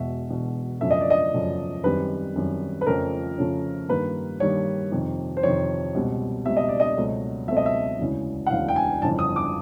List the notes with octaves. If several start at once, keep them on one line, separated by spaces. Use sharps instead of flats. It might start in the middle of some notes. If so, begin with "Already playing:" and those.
Already playing: E1 E2 B2 E5
E1 E2 B2
F#2 C#3 F3 A3 E5
D#5
D5
D#5
F#2 C#3 F3 A3
F#2 D#3 G3 C4 B4
F#2 D#3 G3 C4
B4
F2 C#3 F3 A3 C#4 A#4
F2 C#3 F3 A3 C#4
G2 D#3 G3 A#3 B4
G2 D#3 G3 A#3 C#5
F2 C3 D#3
C5
F2 C3 D#3 C#5
C#2 B2 G3 C4
C#2 B2 G3 C4 E5
D#5
D5
D#5
C#2 B2 F#3 A3 C4
C#2 B2 F#3 A3 C4 E5
D#5
E5
E1 D2 C#3 E3
F#5
E1 D2 C#3 E3 F5
G5
G#5
G1 F2 C#3 E3 A5
D#6
D6